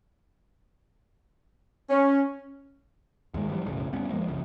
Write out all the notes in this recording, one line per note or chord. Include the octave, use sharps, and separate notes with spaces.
C#4
D#2 G#2 G#3
E3 F3 G3
F#1 B1 A2 C#3
F2 G3 B3 C#4
F1 F3 G#3 A#3
F#1 C2 C#3 F3